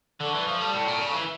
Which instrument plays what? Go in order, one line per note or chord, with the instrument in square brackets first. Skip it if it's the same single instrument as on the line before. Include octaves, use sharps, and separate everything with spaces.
[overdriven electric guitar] D3 [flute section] A4 D5 A5 C#6
[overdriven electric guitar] E3
F3
G3
A2
A#2
C#3
E3